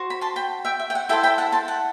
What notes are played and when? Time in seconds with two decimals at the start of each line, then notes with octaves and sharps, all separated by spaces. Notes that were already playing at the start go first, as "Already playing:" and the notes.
Already playing: F#4 C5
0.10 B5
0.21 A5 C6
0.36 G5 B5
0.65 E5 G5
0.79 E5
0.90 G5
0.95 F#5
1.09 E4 A4 C5 E5 G5
1.23 G5 B5
1.38 F#5 A5
1.52 A5 C6
1.68 F#5